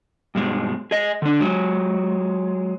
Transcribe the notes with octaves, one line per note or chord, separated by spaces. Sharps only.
G2 B2 G#3
G#4 D#5
D3 D4
F#3 G#3